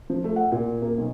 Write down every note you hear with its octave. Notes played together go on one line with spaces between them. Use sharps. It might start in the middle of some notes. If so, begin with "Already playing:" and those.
F3
A3
F#5
A#2
A#3
B1